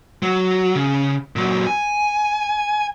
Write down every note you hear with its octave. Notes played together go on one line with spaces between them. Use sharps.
F#3
C#3
A#2 F#3
G#5